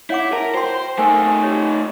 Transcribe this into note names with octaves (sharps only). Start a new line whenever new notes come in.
E4 C#5 F#5 D6
A#4 A5
F#4 C5 G5 C6
A3 D#4 A#4 C5 G#5
G4 C#5